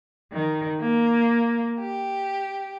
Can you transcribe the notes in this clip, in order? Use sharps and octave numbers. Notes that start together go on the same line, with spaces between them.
D#3
A#3
G4